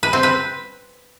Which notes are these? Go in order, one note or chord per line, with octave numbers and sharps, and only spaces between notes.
B4
C4
B4